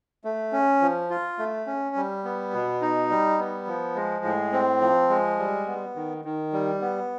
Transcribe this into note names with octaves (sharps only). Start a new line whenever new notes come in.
A3
C#4
F3
F4
A3
C#4
G3
B3
B2
D#4
G3
B3
F3
G#3
A2
C4
F3
G#3
G3
B3
D#3
D#3
G3
B3